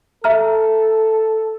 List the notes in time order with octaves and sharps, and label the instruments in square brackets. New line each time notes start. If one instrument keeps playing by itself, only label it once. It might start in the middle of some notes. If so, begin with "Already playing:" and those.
[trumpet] A4 [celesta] E5 A#5 F6